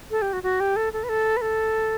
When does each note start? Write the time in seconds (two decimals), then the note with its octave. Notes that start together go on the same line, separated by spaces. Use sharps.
0.11 A4
0.22 G4
0.33 F#4
0.43 F#4
0.60 G4
0.76 A4
0.93 A4
1.04 B4
1.09 A4
1.37 B4
1.41 A4